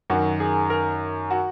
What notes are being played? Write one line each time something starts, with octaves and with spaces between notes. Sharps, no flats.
F#2 D#3 F#3 F#4
G#4
A#4
F#4